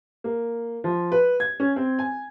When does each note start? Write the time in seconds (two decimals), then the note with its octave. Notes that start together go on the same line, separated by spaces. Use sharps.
0.24 A#3
0.84 F3
1.12 B4
1.40 G#6
1.60 C#4
1.76 C4
1.99 G#5